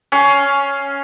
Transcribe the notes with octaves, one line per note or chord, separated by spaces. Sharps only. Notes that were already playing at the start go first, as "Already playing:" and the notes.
C#4 F5